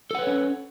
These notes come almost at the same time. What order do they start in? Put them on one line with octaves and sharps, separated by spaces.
A4 F#5 B4 C#5 C#4